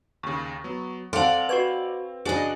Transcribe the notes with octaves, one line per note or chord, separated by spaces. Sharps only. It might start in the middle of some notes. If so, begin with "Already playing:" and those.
D#2 C#3 C#6
F#3 B3
C4 A4 D5 F5 F#5 A5 C6 F7
F#4 B4 C#6 G#6
C#3 D4 F#4 G#4 D5 D#5 G#5